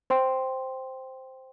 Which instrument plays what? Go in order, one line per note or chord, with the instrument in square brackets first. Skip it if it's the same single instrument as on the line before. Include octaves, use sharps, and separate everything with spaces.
[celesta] C5 G5 C6